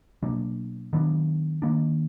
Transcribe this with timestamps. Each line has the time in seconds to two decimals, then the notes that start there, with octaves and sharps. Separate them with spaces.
0.23 B2 F#3 A#3 D4
0.93 D#3 F#3 B3 D4
1.62 D#3 A#3 D4